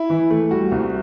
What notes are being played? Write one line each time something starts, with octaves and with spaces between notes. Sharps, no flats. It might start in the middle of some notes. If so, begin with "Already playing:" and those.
Already playing: E4
E3
A3
G3 F#4
C2